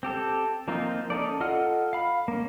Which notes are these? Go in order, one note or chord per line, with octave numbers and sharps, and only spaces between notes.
C4 G4 A4
F3 A#3 C4 D#4 F4
C#4 D#4 A4 D5
F4 A4 D#5 F#5 F6
F5 B5
A#3 C#4